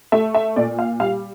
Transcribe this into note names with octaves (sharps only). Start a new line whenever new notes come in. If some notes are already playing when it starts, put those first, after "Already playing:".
A3 E5
E5
A#2 D5
F5
G3 F5